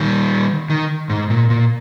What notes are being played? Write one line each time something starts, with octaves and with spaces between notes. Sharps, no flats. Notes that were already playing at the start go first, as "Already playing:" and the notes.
Already playing: D#3 G3
D#3
G#2
A#2
A#2